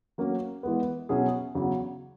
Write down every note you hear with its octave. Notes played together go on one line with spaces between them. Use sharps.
F#3 A#3 C#4
E3 G#3 B3
B2 F#3 C#4 E4 G#4
E2 C#3 F#3